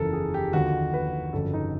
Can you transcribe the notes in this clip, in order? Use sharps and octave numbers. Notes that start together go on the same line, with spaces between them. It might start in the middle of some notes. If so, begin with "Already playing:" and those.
Already playing: F#1 E2 C#3 F3 A4 A#4
G#4
G4
D#2 D3 F3 F#4
B4
G1 F2 C#3 F#3 A4
D#4